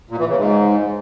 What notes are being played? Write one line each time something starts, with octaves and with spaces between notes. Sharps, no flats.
A#2
E3
C#3
G#2